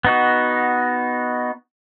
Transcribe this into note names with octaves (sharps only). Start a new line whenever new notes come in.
B3 D#4 F#4